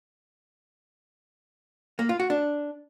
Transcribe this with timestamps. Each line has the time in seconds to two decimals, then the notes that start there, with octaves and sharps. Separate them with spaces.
1.99 A#3
2.09 F4
2.20 F#4
2.30 D4